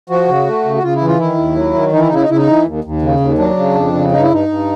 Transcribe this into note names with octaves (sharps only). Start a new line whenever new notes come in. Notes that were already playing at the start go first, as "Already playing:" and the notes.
F3 F#4
C#3
A3
C#3
F#4
C#3 F4
E4
E3
F4
D#3 E4
D#2
F#3
D#3
E3 D#4
E4
D#4
C#3 E4
D#4
C#3 E4
D#4
E3
D#2
D#2
C#3
D#2
F#3 D4
C#3
F2
C#3
G2 D#4
E4
G2 D#4
G2